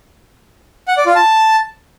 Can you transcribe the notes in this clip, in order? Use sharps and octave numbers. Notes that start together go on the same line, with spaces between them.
F#5
D5
F4
A5